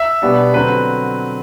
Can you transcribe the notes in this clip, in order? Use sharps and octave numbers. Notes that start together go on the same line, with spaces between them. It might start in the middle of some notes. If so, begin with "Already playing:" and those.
Already playing: E5
B2 G3 B3 D4
D3 F#3 C4 B4